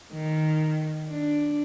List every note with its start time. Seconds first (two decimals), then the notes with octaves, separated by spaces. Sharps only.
0.13 D#3
1.09 D4